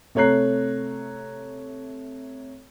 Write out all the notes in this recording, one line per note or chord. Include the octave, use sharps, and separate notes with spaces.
C3 A3 C#5 A#5 F#6 C7